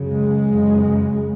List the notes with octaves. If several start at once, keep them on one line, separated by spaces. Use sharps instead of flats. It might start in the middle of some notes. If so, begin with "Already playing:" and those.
Already playing: F#2 C#3
G#3
F#2 C#3